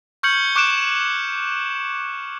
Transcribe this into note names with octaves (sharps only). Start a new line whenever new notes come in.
C#6 F6 G6 G#6 C#7 F#7
C#6 D6 F#6 D7 E7